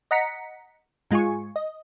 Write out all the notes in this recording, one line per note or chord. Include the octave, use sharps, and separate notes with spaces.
D#5 F#5 A#5 B6 C#7
G#2 G#3 F4 G#5 C#6
D#5